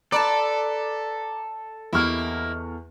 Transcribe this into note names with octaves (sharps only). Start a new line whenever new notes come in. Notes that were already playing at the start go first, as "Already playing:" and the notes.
A4 B4 D5 A5 A#5 D6
E2 A#3 E4 G4 D#5 C#6 F6